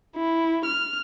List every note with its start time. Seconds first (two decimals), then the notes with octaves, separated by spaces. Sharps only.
0.16 E4
0.66 F6